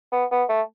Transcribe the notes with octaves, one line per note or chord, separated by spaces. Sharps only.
B3
B3
A3